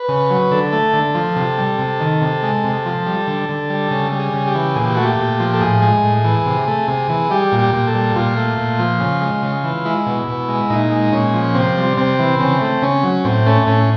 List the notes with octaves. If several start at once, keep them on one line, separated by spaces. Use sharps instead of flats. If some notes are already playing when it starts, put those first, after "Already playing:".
Already playing: B4
C#3
F#3
D3 A4
A3
D3
F3
C3
G3
C3
D#3
C3
G#3
C3
F3
G3
D3
D3
G3
C#3
G3
G#4
C#3
G4
E3
A#2 G#4
G4
A3 F#4
G4
A#2
F3
A4
A2 G#4
G#3
A2
E3
C3
A3
C3
E3
G3 G4
A#2
G4
A#2
A4
G3
A#2 F4
A3
A#2
F3
C#3
G#3
C#3
E3
G#3 E4
B2
B2
G#3
A#2 D#4
G#3
A#2 C#4
F3
C3 C4
G3
C3 C4
E3
C#3 C4
A3
C#3 C#4
F#3
A2 C4
A3 C#4
A2 C#4